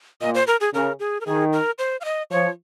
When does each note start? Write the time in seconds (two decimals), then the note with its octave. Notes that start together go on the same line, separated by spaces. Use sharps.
0.21 A#2 D#5
0.35 C5
0.47 A#4
0.61 G#4
0.73 C#3 A#4
1.00 G#4
1.21 A#4
1.26 D#3 G#4
1.53 A#4
1.78 C5
2.01 F5
2.05 D#5
2.31 F3 C#5